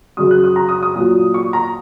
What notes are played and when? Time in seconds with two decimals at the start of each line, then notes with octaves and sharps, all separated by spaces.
0.17 F#2 C#3 F#3 D#6
0.31 F#6
0.44 D#6
0.56 A#5
0.69 D#6
0.83 D#6
0.95 A#2 F#3
1.34 C#6
1.53 A#5